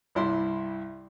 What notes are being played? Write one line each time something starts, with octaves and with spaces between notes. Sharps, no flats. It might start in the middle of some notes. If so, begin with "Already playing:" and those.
C2 G2 E4 D5 C6